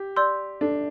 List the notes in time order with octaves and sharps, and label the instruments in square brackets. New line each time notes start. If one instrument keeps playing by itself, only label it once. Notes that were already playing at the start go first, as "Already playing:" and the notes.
Already playing: [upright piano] G4
[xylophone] D5 C6 E6 G6
[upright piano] D4 [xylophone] A4